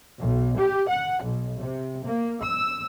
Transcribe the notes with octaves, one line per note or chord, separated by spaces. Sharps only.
B1
G4
F#5
B1
C3
A#3
E6